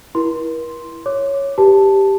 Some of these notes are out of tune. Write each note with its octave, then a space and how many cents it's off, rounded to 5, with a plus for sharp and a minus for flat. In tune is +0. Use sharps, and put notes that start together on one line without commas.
E4 +0 A#4 +45 C6 +0
C#5 +0 D6 +0
G4 +0 B4 -5 A5 +0